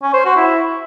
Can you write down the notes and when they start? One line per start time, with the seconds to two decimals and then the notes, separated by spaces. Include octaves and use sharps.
0.03 C#4
0.14 C5
0.25 F#4
0.37 E4